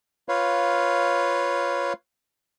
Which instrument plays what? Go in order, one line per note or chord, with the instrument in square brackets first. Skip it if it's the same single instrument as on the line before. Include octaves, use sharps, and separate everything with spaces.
[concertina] F4 B4 C#5 F5